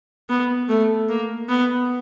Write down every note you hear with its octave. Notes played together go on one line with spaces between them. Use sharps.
B3
A3
A#3
B3